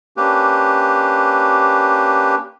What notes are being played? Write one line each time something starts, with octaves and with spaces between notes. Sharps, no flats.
A#3 C#4 D4 G4 B4